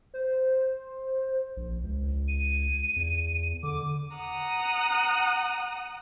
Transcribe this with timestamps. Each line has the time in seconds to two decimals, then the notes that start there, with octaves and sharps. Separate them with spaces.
0.14 C5
1.57 A#1
1.83 C#2
2.28 D#7
2.96 E2
3.63 D3 D6
4.17 F#5 A#5 D#6